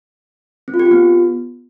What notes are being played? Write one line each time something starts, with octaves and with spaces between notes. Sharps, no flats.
C4
F4
G4
F4
B3